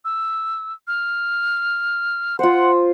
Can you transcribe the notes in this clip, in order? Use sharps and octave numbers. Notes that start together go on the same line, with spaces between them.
E6
F6
F4 C5 F#5